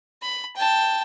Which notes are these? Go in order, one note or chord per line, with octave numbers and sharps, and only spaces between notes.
B5
G5 A5